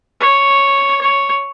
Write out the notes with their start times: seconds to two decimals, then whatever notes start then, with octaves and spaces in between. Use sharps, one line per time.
0.20 C#5
1.01 C#5